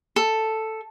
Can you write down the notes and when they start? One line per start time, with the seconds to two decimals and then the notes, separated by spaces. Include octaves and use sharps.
0.16 A4